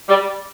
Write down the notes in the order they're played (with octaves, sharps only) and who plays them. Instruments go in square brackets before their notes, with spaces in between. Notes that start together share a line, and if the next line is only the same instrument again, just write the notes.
[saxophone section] G3